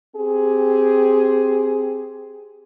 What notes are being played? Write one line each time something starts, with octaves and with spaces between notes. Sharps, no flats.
C4 G4 G#4